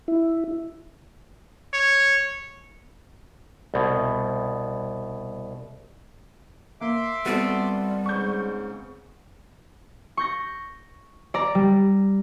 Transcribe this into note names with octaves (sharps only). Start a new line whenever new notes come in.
E4
C#5
C2 B2
A#3 E5 C6 D6
G3 B3 C4 F#4 A4
G#2 C#3 C#6 G6
C#6 G6 A#6
D5 A#5
G3